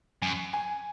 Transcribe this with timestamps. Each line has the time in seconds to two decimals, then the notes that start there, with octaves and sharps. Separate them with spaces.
0.22 F#2 G#5
0.53 G#5